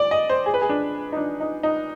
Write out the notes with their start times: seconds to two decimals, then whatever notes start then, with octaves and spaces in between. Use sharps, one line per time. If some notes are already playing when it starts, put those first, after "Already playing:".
Already playing: D5
0.11 D#5
0.29 C5
0.46 G#4
0.54 B4
0.61 G#4
0.69 D4
1.12 D#4
1.17 D4
1.41 D#4
1.63 D#4